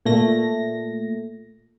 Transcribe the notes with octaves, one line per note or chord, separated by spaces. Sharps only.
A#2 A3 A#6